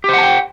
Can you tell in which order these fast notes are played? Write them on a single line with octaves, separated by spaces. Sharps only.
G4 C5 F#5 A5 G5